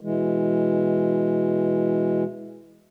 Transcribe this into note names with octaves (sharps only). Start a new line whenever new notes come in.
B2 E3 G#3